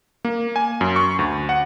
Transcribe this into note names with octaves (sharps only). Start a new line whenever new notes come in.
A#3
G#5
F#2
C#6
D2
F#5